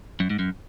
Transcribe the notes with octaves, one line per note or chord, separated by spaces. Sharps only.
F#2
G#2
F#2